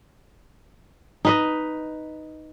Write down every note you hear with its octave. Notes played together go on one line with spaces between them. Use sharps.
D#4 B4 D#5